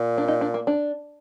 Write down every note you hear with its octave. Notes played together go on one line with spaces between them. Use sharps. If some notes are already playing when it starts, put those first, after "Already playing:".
Already playing: A#2
D4
D#4
D4
A#3
D4